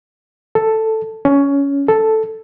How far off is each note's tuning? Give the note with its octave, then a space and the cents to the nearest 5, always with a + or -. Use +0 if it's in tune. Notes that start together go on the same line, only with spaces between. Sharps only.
A4 +5
C#4 +15
A4 +0